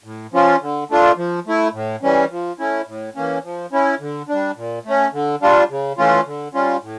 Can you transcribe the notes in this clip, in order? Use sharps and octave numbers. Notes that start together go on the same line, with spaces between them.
A2
F3 C#4 F4
D3
A3 D4 F4
F3
A3 E4
A2
E3 G3 C#4
F3
A3 C#4 E4
A2
E3 A#3 C#4
F3
C#4 E4
D3
G3 D4
A#2
A3 C#4
D3
G3 D4 F4
C#3
E3 A3 C#4 F4
D3
G3 C#4 F4
A2